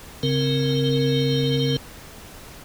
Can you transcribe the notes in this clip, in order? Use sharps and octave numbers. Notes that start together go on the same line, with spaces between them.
C#3 C4 A#4